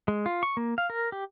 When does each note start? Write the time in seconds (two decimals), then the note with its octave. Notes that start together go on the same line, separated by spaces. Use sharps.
0.08 G#3
0.26 F4
0.43 C#6
0.57 A#3
0.78 F5
0.90 A#4
1.12 G4